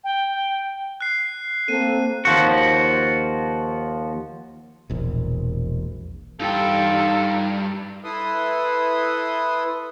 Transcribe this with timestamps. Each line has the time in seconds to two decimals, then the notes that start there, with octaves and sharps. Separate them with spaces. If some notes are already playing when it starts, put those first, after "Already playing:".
0.04 G5
1.01 F#6 C7
1.68 A#3 C4 A4 D#7
2.25 D#2 F3 F#4
4.90 E1 A#1
6.40 G2 D#4 F4 A4 G5
8.04 E4 A4 B4 C6 D#6